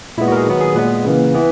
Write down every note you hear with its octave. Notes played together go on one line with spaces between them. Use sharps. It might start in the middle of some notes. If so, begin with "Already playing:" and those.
A#2 G#3 B3 E4
F#4
A#4
G#4
D#3 F#3 B3
G#4
A#2 G#3 B3 B4
C#3 E3 A#3
E3 B3